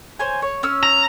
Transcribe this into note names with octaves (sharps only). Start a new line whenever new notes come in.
C5 C#5 G#5
C#5
C#4 E6 F6
A#5